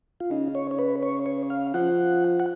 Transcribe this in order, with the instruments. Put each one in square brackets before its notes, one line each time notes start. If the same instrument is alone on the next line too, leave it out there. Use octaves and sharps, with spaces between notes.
[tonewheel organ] F4
[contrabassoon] C#3 [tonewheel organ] D#4
[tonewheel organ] C#5
C#5
B4
C#5
C#5
F5
[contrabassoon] F3 [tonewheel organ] F#5
[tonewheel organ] F#5